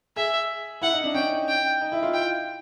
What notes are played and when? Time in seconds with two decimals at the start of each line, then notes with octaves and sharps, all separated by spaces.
0.16 G#4 E5
0.82 E4 F#5
0.93 D#4
1.04 D4
1.15 C#4 G5
1.49 G5
1.81 D#4
1.92 E4
2.03 F4
2.14 G5